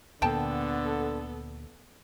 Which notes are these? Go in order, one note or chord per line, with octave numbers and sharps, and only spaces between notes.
D2 A#2 D3 A#3 B3 A4 G5 A5